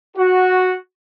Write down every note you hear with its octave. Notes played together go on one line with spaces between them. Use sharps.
F#4